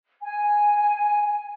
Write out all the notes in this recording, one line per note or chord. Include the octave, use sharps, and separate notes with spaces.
G#5